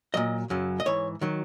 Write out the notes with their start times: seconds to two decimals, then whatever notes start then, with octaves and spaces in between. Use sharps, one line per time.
0.14 A#2 F#3 D#5
0.50 F#2 C#3 F#3
0.80 D#5
0.86 G#2 E3 C#5
1.21 D#3 F#3